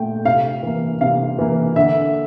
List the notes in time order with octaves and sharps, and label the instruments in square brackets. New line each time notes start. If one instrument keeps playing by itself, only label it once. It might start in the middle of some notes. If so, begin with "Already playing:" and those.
Already playing: [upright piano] A#2 A3 G5
C3 F5
E3 A#3
C3 F5
E3 A#3
D3 E5